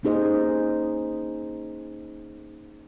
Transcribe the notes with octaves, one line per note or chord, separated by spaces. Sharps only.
A#3 C#4 D#4 G#4 C5 D#5